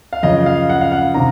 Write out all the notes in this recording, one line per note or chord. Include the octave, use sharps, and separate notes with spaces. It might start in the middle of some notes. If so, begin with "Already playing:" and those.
F5
F#2 C#3 F3 D#5
F5
F#5
F5
F#5
C3 D#3 A#5